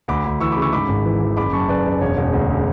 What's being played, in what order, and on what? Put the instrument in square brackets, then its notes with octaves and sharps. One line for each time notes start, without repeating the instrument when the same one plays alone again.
[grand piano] D2 B5 D6
D2
E3 C#6 E6
C#3 B5 D6
C#6 E6
G#2 B5 D6
G#1
E3
E3
F#1 B5 D6
F#2 A5 C#6
F#1 B4 D5
F#1
E1 C#5
E1
D2